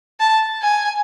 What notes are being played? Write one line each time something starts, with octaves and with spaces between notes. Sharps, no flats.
A5
G#5